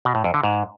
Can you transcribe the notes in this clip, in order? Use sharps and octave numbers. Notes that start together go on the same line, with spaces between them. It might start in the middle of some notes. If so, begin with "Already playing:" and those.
B2
A2
F2
D3
G#2